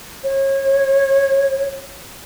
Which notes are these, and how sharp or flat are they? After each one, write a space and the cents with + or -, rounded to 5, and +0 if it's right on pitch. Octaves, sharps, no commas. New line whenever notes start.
C#5 -30